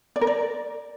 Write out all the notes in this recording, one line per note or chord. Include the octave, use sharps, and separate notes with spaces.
D5
A#4
D5